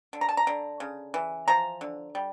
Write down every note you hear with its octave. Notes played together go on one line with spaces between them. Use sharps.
D3
A#5
A5
A#5
D3
C#3
E3
F3 A#5
D3
G3